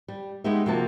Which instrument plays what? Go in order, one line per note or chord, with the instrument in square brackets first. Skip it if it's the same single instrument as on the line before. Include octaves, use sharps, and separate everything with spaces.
[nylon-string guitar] G3
G#3 B3 D#4 G4 E5
C3 F3 A#3 F#4 A5